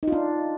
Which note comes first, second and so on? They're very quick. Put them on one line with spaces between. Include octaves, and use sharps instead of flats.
D#4 F4 D4